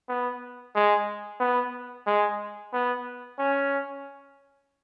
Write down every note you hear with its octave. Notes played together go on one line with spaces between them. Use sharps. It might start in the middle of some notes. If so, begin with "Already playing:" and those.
B3
G#3
B3
G#3
B3
C#4